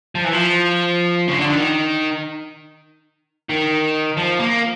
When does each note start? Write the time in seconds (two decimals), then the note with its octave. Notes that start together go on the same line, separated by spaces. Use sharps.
0.15 F3
0.24 E3
0.33 F3
1.28 C#3
1.39 D3
1.49 D#3
3.49 D#3
4.17 F3
4.39 A#3